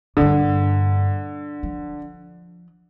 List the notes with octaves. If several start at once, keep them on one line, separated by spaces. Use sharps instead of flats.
G2 A#2 D3
F3